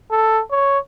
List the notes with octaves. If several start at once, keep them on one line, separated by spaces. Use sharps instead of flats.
A4
C#5